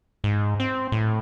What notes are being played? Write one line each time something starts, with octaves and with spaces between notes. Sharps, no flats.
G#2
C4
A2